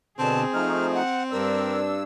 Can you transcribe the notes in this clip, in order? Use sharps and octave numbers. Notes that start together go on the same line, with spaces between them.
B2 D3 C4 G#4 A5
F3 A3 D#4 F6
F#5
G2 D4 A#4 E6